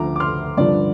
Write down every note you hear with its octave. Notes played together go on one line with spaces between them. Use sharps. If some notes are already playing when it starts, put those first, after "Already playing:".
Already playing: D2 D3 F3 A#5 D6
D6
C6 F6
G2 D3 F3 D5